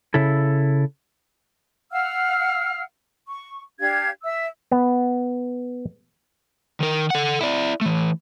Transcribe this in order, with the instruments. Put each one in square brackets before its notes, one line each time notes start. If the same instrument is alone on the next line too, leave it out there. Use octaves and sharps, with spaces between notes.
[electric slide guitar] C#3 E4 A4
[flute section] F5 F#5 E6 F6
C#6
D4 G4 F5 G#6
E5 E6
[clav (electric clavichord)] B3
[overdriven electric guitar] D#3 A#4
A4 F#5
E4 D5
E3 A3